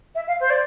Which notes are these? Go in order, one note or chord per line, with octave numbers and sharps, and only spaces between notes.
E5
F5
C5
D5